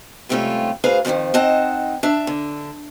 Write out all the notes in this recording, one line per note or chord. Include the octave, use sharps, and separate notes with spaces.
G#2 C3 G3 A3 C#4 F4
D2 G#4 B4 C5 F5 A#5
F2 B2 D3 D#3 F3
C4 D#4 D#5 F#5 A5
D4 E5
D3